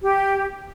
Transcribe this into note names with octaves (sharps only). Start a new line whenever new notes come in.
G4